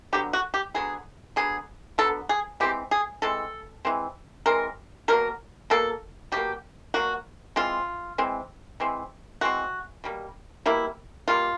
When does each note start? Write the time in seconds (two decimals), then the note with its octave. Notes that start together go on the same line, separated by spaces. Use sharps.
0.13 D3 F#3 B3 G4
0.33 F#4
0.54 G4
0.74 D3 F#3 B3 G#4
1.36 D3 F#3 B3 G#4
1.98 D3 F#3 B3 A4
2.29 G#4
2.60 E3 G#3 C4 G4
2.91 G#4
3.22 E3 G#3 C4 A4
3.85 E3 G#3 C4
4.46 E3 G#3 C4 A#4
5.08 B2 F#3 A#3 A#4
5.70 B2 F#3 A#3 A4
6.32 B2 F#3 A#3 G4
6.94 B2 F#3 A#3 F#4
7.56 E3 G#3 C4 F4
8.18 E3 G#3 C4
8.80 E3 G#3 C4
9.41 E3 G#3 C4 F#4
10.04 B2 G3 A#3
10.66 B2 G3 A#3 E4
11.28 B2 G3 A#3 F4